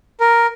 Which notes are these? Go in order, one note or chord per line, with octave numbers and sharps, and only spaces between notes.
A#4